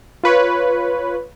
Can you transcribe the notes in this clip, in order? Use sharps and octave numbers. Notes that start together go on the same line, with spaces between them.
F4 B4 C#5